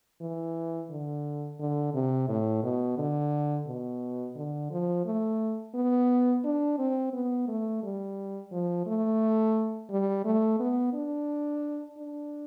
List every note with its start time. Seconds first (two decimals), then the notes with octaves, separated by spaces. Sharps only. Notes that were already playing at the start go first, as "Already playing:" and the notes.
0.21 E3
0.90 D3
1.59 D3
1.94 C3
2.28 A2
2.63 B2
2.98 D3
3.67 B2
4.36 D3
4.71 F3
5.05 A3
5.75 B3
6.44 D4
6.78 C4
7.13 B3
7.48 A3
7.83 G3
8.52 F3
8.87 A3
9.90 G3
10.25 A3
10.60 B3
10.94 D4
11.98 D4